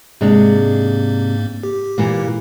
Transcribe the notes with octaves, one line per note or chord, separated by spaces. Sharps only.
G#2 C3 G#3 A#3 D4
G4
A#2 E3 A#3